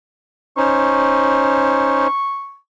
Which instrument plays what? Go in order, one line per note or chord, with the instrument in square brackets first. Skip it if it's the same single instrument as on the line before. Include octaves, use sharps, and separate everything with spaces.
[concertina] C#4 D#4 C5 [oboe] C#6